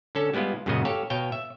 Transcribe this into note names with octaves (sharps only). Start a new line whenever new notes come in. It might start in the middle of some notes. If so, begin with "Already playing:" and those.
D3 C#4 A4
G3 G#3 B3 E4 F4
F#2 A#2 C#3 G#3 F#4 D#5
G4 A4 C#5 F5
B2 C#5 F5 G5
E5